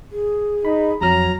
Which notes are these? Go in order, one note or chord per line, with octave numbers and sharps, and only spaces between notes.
G#4
D#4 B5
F2 F#3 F#4 C#5 A#5 F6